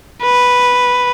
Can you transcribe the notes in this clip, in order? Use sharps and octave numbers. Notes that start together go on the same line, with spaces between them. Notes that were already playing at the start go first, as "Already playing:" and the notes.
B4